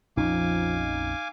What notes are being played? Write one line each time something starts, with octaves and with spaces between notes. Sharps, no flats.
A#1 F2 F3 C#4 D#4 F5 G#5 D6